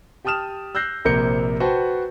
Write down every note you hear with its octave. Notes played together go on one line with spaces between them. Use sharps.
G4 G5 A5 D#6 F6 E7
E6 F#6 G6 A#6 C7
A#1 C3 A#3 A#4 G6 C#7
F#4 B4 C5 G5 A5